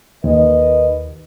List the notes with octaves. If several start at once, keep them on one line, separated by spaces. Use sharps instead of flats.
D#2 D#3 B4 D#5